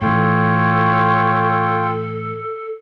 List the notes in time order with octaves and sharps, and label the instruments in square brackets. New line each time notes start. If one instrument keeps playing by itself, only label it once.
[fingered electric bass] A2 E3 [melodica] F4 G5 [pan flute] A4 [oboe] C#5